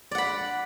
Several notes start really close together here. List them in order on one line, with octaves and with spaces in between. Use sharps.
D5 F#5 B5